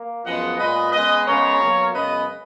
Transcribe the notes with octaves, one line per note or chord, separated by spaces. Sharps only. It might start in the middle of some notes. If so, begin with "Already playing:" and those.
Already playing: A#3
F#2 F3 G#3 B3 D#5 F#5
A#2 G#3 B3 B4 D#5
C#3 G#3 B3 B4 D#5
C#3 G#3 B3 A#4 C#5
B2 F#3 A#3
F#2 C#3 G#3 B3 B4 D#5